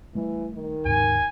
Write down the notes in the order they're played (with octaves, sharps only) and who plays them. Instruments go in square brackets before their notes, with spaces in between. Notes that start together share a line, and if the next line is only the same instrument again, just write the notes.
[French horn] E3 [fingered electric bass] G3 A3
[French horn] D#3
[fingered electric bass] D#2 G#2 C#3 [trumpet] G#5